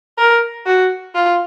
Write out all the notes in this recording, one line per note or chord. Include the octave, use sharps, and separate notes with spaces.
A#4
F#4
F4